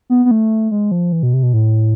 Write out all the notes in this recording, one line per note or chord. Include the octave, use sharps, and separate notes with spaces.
B3
B3
A3
G#3
F3
E3
B2
C3
B2
A2